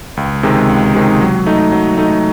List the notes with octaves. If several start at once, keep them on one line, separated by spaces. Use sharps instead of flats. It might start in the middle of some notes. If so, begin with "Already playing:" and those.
C#2
C3 D#3 G#3
C#2
C3 D#3 G#3
F#3
A3 D#4
F#3
A3 D#4